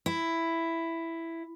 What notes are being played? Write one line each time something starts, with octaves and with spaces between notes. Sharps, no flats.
E4